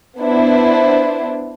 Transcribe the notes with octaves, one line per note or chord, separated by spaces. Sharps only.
B3 D4 E4 C5